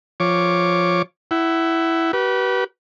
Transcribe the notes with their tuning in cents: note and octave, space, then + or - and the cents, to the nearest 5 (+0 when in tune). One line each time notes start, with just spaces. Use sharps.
F3 +0 C#5 +0 D6 +0
E4 +0 F#5 +30
G4 -45 B4 -25